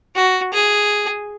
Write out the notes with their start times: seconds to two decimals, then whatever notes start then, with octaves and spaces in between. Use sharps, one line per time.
0.15 F#4
0.53 G#4